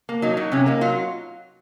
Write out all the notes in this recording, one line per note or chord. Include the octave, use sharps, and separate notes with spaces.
A#3
F#3 D#4
F#3
C3 C#4
A#3 D#4
F#3 F4